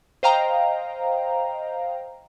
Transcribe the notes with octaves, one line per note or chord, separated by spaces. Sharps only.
C5 D#5 F5 G5 A#5